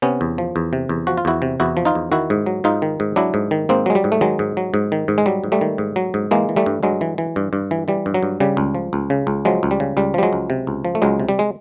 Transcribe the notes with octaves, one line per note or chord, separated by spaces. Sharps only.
C3 B3 C#4
E2
F3
E2
C3
E2
F3 F#4
F4
E2 E4 F#4
C3
E2 E4 F#4
F3
D#4 F4
E2
D#3 E4 F#4
G#2
F#3
G#2 D#4 F4
D#3
G#2
F#3 D4 E4
G#2
D#3
G#2 A#3 C4
F#3 G#3
G3
G#2
A3
D#3 F#3 G#3
G#2
F#3
G#2
D#3
G#2
G#3
F#3 G3
G#2
G3 A3
D#3
G#2
F#3
G#2
E3 G#3 A#3
E3
G3 A3
G2
G2 F#3 G#3
E3
E3
G2
G2
E3
E3 G3
G2
F#3
G2
C#3 G3
C#2
F3
C#2
C#3
C#2
F3 F#3 G#3
C#2
G3
C#3
C#2 G3
F3 G3
F#3 G#3
C#2
C3
C#2
F3
A3
C#2 F#3 G#3
C3
G3
G#3